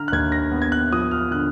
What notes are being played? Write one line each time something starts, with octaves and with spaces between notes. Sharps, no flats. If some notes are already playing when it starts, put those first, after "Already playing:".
Already playing: D3 A#5 F6
F#6
D#2 G#6
A#6
B3
G#6
F#6
F3 D#6
F6
D3 F#6